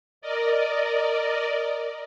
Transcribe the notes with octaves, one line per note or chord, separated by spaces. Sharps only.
A#4 D5 D#5